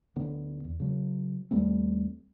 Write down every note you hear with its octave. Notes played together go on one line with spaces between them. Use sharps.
D1 D3 B3
E2
C#3 F#3
D#2 G3 A3 C4